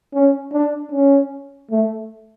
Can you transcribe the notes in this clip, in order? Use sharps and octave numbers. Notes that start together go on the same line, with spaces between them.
C#4
D4
C#4
A3